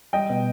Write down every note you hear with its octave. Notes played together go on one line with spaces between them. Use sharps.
G3 D#5 G5
B2